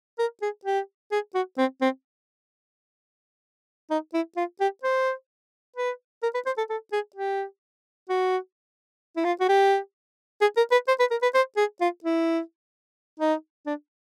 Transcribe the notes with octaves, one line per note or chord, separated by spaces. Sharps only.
A#4
G#4
G4
G#4
F#4
C4
C4
D#4
E4
F4
G4
C5
B4
A#4
B4
C5
A4
A4
G#4
G4
F#4
E4
F4
F#4
G4
G#4
A#4
B4
C5
B4
A#4
B4
C5
G#4
F4
E4
D#4
D4